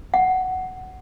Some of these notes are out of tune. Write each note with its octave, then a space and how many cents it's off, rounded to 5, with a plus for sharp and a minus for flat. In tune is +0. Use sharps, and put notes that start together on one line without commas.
F#5 +10